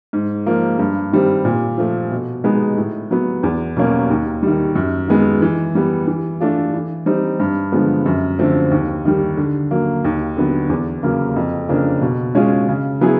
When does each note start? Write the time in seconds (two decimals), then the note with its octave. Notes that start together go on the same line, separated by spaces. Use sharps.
0.13 G#2
0.46 F3 A#3
0.79 G2
1.12 D#3 G3 C4
1.45 A#2
1.78 F3 A3
2.12 B2
2.44 G#3 B3 D#4
2.78 A2
3.11 F#3 B3
3.43 E2
3.77 B2 F#3 A#3 C#4
4.10 D#2
4.43 D#3 G3
4.76 F#2
5.08 D#3 G#3 B3
5.42 E3
5.75 G3 B3
6.07 E3
6.40 A3 D4 F4
6.74 E3
7.06 G3 C4 D#4
7.40 G2
7.72 D3 F3 G#3 B3
8.06 F#2
8.39 D3 F3 A3 C4
8.71 D#2
9.05 D#3 G3
9.37 D3
9.71 F#3 A#3
10.04 D#2
10.37 D3 F#3 B3
10.69 E2
11.03 C#3 F#3 A#3
11.36 F2
11.69 C#3 F3 A#3 D4
12.02 B2
12.35 G#3 C#4 F4 G#4
12.68 C#3
13.01 F#3 B3 E4 G#4